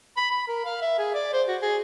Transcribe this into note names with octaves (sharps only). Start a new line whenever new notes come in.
B5
B5
A#4
F5
E5
G#4
D5
C5
F#4
G#4